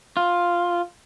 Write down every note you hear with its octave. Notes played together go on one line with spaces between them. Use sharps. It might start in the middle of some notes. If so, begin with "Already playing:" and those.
F4